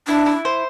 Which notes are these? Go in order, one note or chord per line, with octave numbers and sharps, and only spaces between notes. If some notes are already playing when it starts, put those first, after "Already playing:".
D4 E4
E4
C5